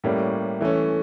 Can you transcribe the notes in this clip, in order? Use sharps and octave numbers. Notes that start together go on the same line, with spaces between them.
A2 G3 A#3 C#4
E3 A3 C#4